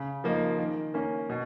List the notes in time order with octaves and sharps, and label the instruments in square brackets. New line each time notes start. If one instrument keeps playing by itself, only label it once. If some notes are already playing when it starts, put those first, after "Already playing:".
Already playing: [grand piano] C#3
F3 A#3 D#4
D#3
A#3 C#4
B2